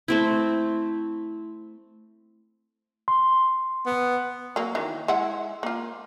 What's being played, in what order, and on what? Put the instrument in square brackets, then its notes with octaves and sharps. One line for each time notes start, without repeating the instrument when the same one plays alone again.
[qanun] A3 C4 E4
[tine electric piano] C6
[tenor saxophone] B3
[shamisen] F#3 A#3
D#3 E3
G#3 E4 F#5
A#3 F4